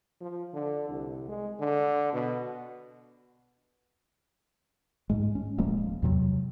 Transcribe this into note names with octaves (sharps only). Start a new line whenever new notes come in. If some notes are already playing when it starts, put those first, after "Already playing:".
F3
D3
C2
G#3
D3
B2
G#2 G#3
C#4
D#1 F3 G#3 A#3
E2 C3 F#3